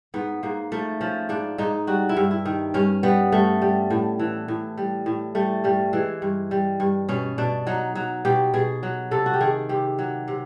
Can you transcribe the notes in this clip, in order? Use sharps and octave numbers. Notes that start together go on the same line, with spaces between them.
G#2 B3
G#2 A#3
F3 A3
F3 C#4
G#2 D4
G#2 D#4
G3 F#4
E4
G2
E4
D#3
G2 C#4
G3 B3
G2 A3
G3
A2
E3
A2
G3
A2
G3 A3
G2 G3
E3 G#3
G2
G3
G2
B2 C#4
B2 D4
F#3 D#4
F#3
B2 G4
B2 G#4
F#3
C3 A4
F#4
G4
D#3 G#4
C3 G4
F#3
C3